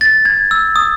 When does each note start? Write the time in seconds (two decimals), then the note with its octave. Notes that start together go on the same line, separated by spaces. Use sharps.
0.01 A6
0.25 G#6
0.51 E6
0.76 D#6